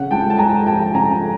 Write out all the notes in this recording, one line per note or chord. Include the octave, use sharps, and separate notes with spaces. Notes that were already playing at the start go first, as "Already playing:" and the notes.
Already playing: C#3 F#5
C#2 G5 A5
A5
G#3 G#5 A#5
F3 G5 A5
C#3 G#5 A#5